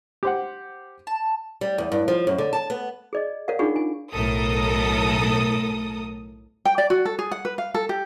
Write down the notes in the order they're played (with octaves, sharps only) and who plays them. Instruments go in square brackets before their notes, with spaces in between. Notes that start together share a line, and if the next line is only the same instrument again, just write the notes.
[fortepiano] G4 C5 F#5
[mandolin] A5
[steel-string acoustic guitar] G3
E2
G2
F3
F#2
D3
A5
B3
[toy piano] G#4 D5 D#5
A#4 C#5 D5 F5 F#5
D4 D#4 F4 G#4 F#5 C#6
G#5
[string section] B1 A2 A4 A#4 D#6
[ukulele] G5
D5
F#4
A4
G#4
F#5
B4
F5
A4
G4